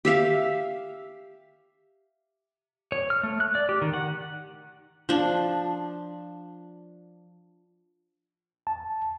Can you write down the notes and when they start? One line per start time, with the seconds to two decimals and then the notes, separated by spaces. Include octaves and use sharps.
0.05 G4 E5 F5
2.92 C#5
3.10 F6
3.23 A3
3.40 F#6
3.55 D5
3.69 G4
3.82 D#3
3.94 F#5
5.09 F3 D4
8.67 A5